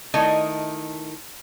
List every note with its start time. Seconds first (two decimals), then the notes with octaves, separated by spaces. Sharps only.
0.14 D#3 A3 E4 D#5